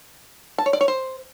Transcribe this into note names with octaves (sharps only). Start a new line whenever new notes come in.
A5
C#5
D5
C#5
C5